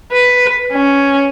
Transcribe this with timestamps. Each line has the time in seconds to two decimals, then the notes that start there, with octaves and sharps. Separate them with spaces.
0.12 B4
0.72 C#4